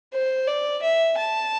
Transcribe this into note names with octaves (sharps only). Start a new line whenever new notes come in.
C5
D5
E5
A5